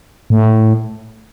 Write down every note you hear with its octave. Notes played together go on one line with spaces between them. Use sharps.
A2